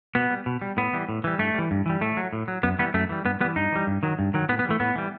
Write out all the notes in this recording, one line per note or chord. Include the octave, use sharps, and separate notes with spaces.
B2 B3
G3
B2
G3
A2 B3
E3 G3
A2
E3 G3
G2 A3
E3 G3
G2
E3 G3
A2 A3
F#3
A2
F#3
F#2 B3
E3 G3 B3
F#2 A3
E3 G3
G2 B3
E3 G3 B3
G2 D#4
E3 G3
G2
D#3 F#3
G2
D#3 F#3
A2 B3
B3
G3
E3 A3
A2 B3
E3 G3